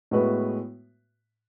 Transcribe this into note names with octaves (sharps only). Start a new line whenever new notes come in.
A2 G#3 B3 F#4 B4